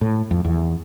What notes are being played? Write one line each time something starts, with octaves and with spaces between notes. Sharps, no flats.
A2
F2
E2